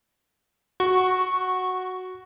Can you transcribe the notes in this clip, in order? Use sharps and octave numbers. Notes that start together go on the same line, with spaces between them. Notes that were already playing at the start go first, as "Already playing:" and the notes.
F#4 C#6